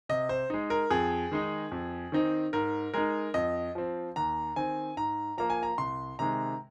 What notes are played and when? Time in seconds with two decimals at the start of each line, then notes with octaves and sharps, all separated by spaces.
0.09 C3 D#5
0.29 C5
0.50 G#3 D#4
0.70 A#4
0.90 F2 G#4
1.32 D#3 G#3 D#4
1.72 F2
2.12 D#3 C4 D#4
2.53 G#2 A#4
2.94 G#3 D#4 A#4
3.34 F2 D#5
3.75 F3 C4
4.16 D#2 A#5
4.56 D#3 C4 G#5
4.97 G#2 A#5
5.38 F3 A#3 A#5
5.50 G#5
5.63 A#5
5.78 C2 C6
6.19 C3 D#3 G#3 A#5